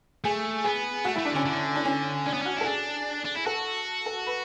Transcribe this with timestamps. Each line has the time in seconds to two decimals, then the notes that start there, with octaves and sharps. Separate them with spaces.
0.24 A3 G#4
0.64 B3 G#4
1.04 A3 F#4
1.16 E4
1.18 A3
1.25 D4
1.31 D3 C#4
1.45 D3
1.75 D4
1.85 C#4
2.26 C#4 D4
2.34 B3
2.42 C#4 F#4
2.57 E4 A4
2.66 D4 G#4
3.25 D4
3.36 E4
3.46 F#4 A4
4.06 A4
4.26 B4